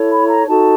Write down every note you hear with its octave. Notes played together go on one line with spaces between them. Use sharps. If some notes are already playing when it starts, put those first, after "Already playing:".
Already playing: E4 A4 C#5
B5
A#5
D#4 F#4 A4 A5